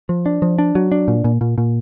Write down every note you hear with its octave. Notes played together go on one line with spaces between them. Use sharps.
F3
D4
F3
D4
F#3
D4
A#2
A#2
A#2
A#2